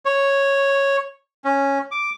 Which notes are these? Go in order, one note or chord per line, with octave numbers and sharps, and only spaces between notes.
C#5
C#4
D6